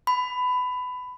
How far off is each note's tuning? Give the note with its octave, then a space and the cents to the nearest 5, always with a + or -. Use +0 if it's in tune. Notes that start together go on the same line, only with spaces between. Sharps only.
B5 +20